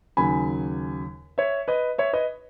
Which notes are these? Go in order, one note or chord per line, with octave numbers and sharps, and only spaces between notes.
D#2 C#3 F#3 G#5 B5
C#5 E5
B4 D#5
C#5 E5
B4 D#5